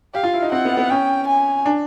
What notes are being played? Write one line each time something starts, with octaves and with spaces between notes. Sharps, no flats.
G4 F5
F4
E4
D#4
C4 F#5
B3
B3
C#4 G5
G#5
D4